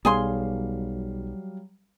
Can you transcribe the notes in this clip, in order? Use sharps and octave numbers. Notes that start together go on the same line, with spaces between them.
B1 F#3 G3 G#4 F5 G#5 C6